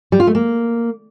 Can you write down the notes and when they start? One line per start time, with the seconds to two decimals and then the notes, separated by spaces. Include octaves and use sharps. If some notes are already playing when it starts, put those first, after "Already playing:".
0.12 G3
0.20 F4
0.27 A3
0.35 A#3